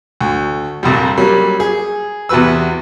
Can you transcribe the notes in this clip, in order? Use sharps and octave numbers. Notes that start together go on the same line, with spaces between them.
D2
A#1 F2 C3 G3
F#3 G3 A#3 C#4
G#4
E2 C3 F#4 B4 E6